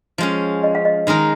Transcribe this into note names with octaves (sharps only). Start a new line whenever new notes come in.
F3 G#3 C#4
D#5
F5
D#5
D#3 G#3 D#4 A#4